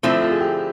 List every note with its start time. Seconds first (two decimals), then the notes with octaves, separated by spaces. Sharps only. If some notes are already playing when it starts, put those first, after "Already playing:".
0.03 D3 F3 A3 C4 E4
0.22 F4
0.31 G#4
0.40 G4